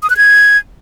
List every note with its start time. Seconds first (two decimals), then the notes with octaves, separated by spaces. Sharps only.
0.03 D#6
0.10 F#6
0.17 G#6